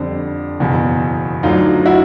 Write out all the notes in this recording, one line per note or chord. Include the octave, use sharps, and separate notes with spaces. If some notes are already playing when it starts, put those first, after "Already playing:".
Already playing: F2 D3 G3
F#1 E2 B2
D2 D3 F#3 D#4 F4
E4 F#4